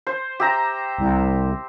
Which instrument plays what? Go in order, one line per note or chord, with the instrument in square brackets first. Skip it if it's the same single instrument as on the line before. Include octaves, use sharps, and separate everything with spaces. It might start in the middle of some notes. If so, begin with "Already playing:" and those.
[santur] C5
G4 E5 A#5
[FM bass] C2